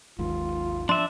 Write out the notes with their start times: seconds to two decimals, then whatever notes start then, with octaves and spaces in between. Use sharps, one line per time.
0.19 G#1 D#2 G#2 F4
0.89 F3 D4 E5 C6